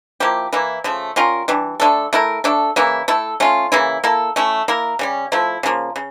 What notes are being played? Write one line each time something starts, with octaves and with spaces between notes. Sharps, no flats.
F3 A#3 E4 G4
E3 A#3 E4
C#3 F3 A3
G3 C#4 F4 A#4
E3 G3 D4
D3 A3 D4 A4
A3 E4 A#4
A3 D4 A4
C#3 E3 A#3 E4
A3 E4 A4
A3 C#4 F4
C#3 E3 A#3 E4
A#3 E4 A4
A3 C#4 E4
A#3 E4 A#4
C#3 G3 C#4
F3 A3 E4
C#3 F3 A#3
C#3